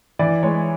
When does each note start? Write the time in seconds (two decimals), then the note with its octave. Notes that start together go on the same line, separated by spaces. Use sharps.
0.19 E3 D5
0.43 G#3 C#5